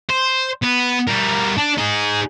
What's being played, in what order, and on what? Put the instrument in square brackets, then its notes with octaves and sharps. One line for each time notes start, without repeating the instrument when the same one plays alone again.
[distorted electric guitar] C5
B3
G3 A#4
D4
D#4 G#4